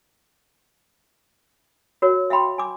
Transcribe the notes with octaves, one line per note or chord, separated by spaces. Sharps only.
F#4 A#4 C#5
E5 F5 G5 B5 C6
G#5 D6